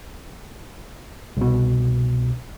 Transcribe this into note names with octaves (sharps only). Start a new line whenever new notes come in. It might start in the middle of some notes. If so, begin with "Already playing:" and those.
C2 B2